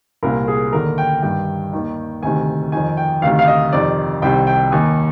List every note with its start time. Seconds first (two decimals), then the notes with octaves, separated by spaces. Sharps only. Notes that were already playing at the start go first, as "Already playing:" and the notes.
0.23 C2 A#2 A#4
0.48 G#4
0.73 D#2 D3 A#4
0.98 G5
1.22 G2 D#3 G5
1.73 D#2 D#3
2.22 D2 C3 D#3 G#5
2.72 F2 D#3 G#5
2.97 G5
3.22 D2 C3 D#3 F5
3.39 F5
3.48 D#5
3.72 F2 C3 D#3 D5
4.22 C2 C3 D#3 G5
4.47 G5
4.72 D#2 D#3 G#5